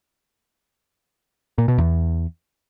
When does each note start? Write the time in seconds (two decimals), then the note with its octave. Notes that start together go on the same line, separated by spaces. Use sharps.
1.58 A#2
1.68 B2
1.78 E2